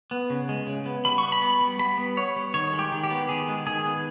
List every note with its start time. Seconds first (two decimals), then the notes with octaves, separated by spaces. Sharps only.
0.11 B3
0.30 C#3
0.49 G#3
0.67 C#3
0.86 B3
1.05 G3 B5
1.18 B3 C#6
1.32 B5
1.42 B3
1.61 G3
1.79 G3 B5
1.98 B3
2.17 B3 C#5
2.36 G3
2.54 D#3 C#5
2.73 G#3
2.79 G4
2.92 D#3
3.04 G4
3.10 B3
3.29 D#3 G#4
3.48 G#3
3.67 D#3 G#4
3.85 B3